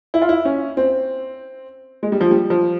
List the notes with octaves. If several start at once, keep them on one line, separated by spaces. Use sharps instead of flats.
E4
F4
E4
C#4
C4
G#3
G3
F3
G3
F3